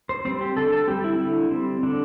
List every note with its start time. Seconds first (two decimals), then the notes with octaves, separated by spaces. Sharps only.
0.09 C5
0.25 G3 C4 C5
0.41 G4
0.56 D3 A4
0.72 A4
0.87 G3 C4 G4
1.04 E4
1.19 D3
1.51 G3 C4
1.83 D3 D4